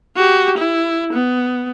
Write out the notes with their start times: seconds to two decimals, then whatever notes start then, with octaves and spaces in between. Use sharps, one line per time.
0.16 F#4 G4
0.58 E4
1.13 B3